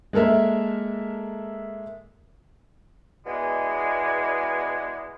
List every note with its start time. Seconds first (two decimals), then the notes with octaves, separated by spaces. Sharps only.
0.13 G#3 A#3 A4 A#4 E5
3.27 E2 B2 G#3 B3 D5 G#5